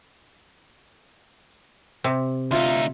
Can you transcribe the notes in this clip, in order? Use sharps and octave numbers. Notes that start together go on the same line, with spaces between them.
C3
D2 D#4 F4 E5 C6